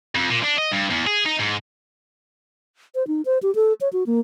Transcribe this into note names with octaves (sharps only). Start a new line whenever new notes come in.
F2
A#2
D4
D#5
G2
E2
G#4
D#4
G#2
C5
D#4
C5
G4
A4
C#5
F#4
A#3